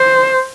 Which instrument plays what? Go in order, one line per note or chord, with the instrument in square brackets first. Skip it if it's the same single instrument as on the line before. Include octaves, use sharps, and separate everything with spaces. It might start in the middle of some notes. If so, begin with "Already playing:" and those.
Already playing: [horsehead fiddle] C5